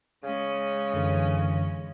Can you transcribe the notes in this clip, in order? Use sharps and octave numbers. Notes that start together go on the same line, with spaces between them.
C#3 G#3 C#4
F#2 D3 E3